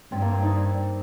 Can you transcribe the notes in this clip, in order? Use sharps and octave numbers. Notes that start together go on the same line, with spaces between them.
G2 C4
A#3
C4
D#4